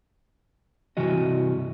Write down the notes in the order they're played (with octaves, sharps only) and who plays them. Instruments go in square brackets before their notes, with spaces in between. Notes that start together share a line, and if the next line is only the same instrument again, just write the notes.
[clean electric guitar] G2 C3 E3 F#4 D#5